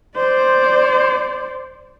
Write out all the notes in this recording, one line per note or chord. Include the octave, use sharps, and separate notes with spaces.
C5 D5